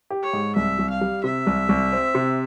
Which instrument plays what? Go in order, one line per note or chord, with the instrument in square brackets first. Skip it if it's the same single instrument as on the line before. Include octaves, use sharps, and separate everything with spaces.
[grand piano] G4
[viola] C#5
[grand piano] G#2
[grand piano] C2 [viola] E5
[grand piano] C2
[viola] F5
[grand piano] G3
[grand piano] C3 [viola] E5
[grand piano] C2
C2
C4
C3